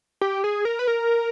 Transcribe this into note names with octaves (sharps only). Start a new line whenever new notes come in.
G4
G#4
A#4
B4
A#4